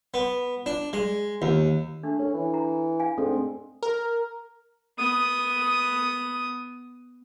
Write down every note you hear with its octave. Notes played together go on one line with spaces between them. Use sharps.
B3
D4
G#3
D#2
A3 D4
C#4 A4
E3
A#5
F5 G#5
G#2 A3 C4 D4 A4
A#4
B3 D#6